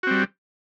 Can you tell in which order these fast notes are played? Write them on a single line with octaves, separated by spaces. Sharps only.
F#4 C4 G3